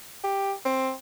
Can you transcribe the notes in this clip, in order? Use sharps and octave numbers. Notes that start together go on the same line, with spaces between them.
G4
C4